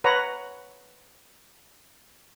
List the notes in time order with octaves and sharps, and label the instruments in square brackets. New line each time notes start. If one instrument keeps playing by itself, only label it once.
[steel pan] B4 C#5 F#5 A#5